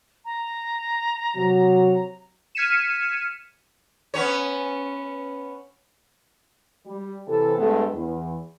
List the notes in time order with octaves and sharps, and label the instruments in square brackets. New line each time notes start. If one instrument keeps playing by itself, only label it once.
[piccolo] A#5
[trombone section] C3 F#3
[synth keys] F6 G#6 B6 C#7 D#7 E7
[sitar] B3 C#4 C#5
[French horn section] G3
C3 E3 A4
G2 G#3 A3 B3 A4
E2